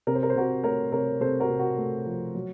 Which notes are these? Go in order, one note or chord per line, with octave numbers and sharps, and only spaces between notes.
C3 A#4
C5
A#4
C5
C3 F#4 A#4
A3 A#4 C#5
C3 A#4 C#5
C3 A4 C5
F#4 A#4
C3
F#4
A3
F3
F#3